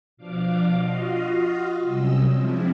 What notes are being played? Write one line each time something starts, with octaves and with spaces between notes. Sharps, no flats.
B2 F3 D4 F5 D6
F4 F#4 D#5 F5
C3 F#3 G3 C#4 D#5 E6
F3 G#3 C4 D4 E4 F4